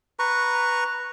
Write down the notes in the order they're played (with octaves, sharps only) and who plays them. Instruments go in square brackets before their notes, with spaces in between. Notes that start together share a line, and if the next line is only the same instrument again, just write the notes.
[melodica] B4 A#5 C#6